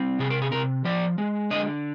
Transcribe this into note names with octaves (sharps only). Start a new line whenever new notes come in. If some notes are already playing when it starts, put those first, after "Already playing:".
Already playing: G3 C4
C3 G#4
A#4
G#4
C3 A#4
F3 D5
G#3
D3 D#5